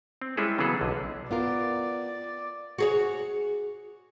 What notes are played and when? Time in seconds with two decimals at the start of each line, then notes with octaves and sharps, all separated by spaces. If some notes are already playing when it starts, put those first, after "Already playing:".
0.22 C4
0.37 G3 G#3 C#4 E4 G#4 A4
0.58 C#3 E3 F#3 B3 G#4 A4
0.81 B1 D3
1.31 B3 F4 A#4 D5
2.78 F#4 G#4 C#5